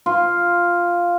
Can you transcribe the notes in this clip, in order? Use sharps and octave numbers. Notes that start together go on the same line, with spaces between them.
F4